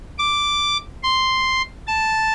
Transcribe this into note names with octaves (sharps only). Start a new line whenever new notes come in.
D6
C6
A5